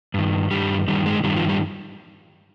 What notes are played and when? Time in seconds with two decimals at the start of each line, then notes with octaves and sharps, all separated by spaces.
0.14 G2 D#3
0.51 G2 D#3 G3
0.88 G2 D#3 G3
1.06 G#3
1.23 G2 D#3 G3
1.36 F3
1.48 G3